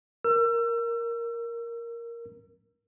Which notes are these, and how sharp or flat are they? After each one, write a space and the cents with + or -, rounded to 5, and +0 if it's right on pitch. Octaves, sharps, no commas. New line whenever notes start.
A#4 +0 E6 +35